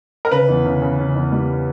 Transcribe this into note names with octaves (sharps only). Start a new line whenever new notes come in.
A#4
C#3 B4
E2
C#3
C#3
C#3
E2
G3